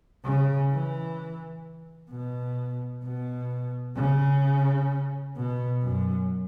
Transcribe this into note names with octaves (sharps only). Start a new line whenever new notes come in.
C#3
E3
B2
B2
C#3
B2
F#2